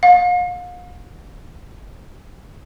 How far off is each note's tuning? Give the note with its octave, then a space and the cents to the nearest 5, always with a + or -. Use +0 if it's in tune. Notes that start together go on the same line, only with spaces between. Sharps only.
F5 +40